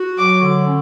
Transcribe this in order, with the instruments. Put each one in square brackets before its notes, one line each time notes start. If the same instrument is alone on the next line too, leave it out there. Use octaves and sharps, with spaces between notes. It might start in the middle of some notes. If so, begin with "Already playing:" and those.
Already playing: [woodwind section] F#4
[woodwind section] F#3 [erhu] D6
[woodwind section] D3
C#4